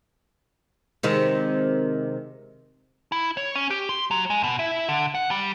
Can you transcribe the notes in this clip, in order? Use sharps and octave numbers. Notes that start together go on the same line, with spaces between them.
C3 D#3 G#3
E4
C#5
C#4
G4
C6
F#3
G#3
B2
E4
D3
F#5
G3